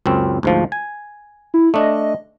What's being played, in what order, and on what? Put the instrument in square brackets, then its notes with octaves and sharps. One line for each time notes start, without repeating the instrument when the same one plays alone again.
[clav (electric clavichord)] C#2 F#2 C4
D2 G#2 F3
G#5
[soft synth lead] E4
[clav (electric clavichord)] A3 D4 [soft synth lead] D#5